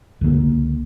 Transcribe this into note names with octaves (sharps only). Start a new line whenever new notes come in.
C#2 D3 D#3 A#3